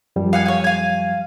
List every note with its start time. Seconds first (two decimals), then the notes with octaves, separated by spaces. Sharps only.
0.16 F#2 F3 G3
0.33 F5 F#5 G#5
0.46 C#5 G#5
0.64 F5 G#5